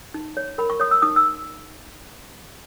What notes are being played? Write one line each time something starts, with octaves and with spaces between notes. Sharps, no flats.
D#4
C#5
A#4 B5
C#6
C#5 D#6
E6
D#4 D#6
E6